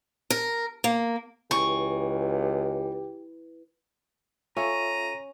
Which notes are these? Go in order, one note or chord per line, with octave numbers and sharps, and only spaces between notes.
A#4
A#3
C#2 E3 G4 C#6
C#4 F4 A4 E5 A#5 D#7